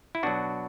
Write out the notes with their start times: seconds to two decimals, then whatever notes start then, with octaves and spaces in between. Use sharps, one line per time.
0.15 E4
0.23 B2 F#3 D4 F#4